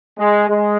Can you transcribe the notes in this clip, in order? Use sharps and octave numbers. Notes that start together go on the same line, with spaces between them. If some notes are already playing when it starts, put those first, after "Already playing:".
G#3
G#3